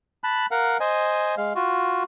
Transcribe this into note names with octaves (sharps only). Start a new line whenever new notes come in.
A5 B5 F#6
A#4 F5 F#5
C5 D#5 G#5
G#3 F5
F4 F#4